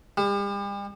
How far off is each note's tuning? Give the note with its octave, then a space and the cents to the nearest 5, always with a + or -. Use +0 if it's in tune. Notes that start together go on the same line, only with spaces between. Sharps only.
G3 +40